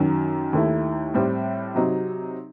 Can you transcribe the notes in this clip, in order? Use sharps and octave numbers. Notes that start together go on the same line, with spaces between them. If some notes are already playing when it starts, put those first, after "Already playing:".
Already playing: F#2 D#3 F#3
D#2 D#3 A3 E4
A2 G3 C4
C3 F#3 C4 D#4